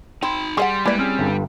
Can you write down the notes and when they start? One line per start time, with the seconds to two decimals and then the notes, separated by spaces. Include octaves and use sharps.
0.23 C4 D#4 B5
0.57 G3 G#4 D#5 F#5 C6
0.85 G#3 A#3 E4 B4 D5
0.99 C4 C#4 G#4
1.19 G1 G2